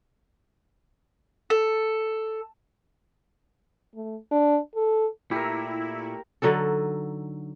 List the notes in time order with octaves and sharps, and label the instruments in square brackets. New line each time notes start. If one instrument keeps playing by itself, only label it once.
[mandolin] A4
[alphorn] A3
D4
A4
[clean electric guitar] A#2 A3 [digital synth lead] E4 [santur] G4 A#4
[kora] D3 F#3 D#4 A4